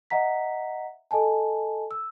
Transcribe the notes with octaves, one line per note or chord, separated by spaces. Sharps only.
D#5 E5 F#5 A#5 B6
A4 D#5 G#5 A5
E6